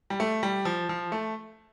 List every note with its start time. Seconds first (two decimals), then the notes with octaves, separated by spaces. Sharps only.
0.10 G3
0.20 A3
0.43 G3
0.65 F3
0.89 F3
1.12 A3